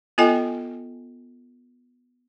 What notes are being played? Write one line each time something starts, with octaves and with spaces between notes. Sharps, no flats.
B3 F4 A4 D#5 G5 G#5